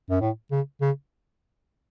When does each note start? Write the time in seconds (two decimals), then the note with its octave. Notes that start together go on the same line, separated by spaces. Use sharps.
0.10 F#2
0.21 A2
0.51 C#3
0.81 C#3